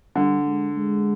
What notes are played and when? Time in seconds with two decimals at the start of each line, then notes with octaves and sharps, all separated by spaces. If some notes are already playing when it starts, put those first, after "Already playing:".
0.15 D3 G3
0.46 G#3
0.77 G#3